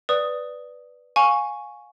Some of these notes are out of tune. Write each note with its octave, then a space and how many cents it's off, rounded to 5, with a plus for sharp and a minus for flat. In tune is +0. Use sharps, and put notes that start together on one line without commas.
B4 +0 D5 +0 D#6 +0
F5 +30 G#5 +0 C#6 +0